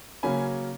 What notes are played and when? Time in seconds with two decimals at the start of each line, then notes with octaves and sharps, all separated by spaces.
0.23 C#3 F#3 A#3 C#4 G#5 B5